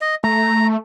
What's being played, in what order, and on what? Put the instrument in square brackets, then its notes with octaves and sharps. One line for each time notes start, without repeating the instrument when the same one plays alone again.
[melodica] D#5
[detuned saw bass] A3 [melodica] A#5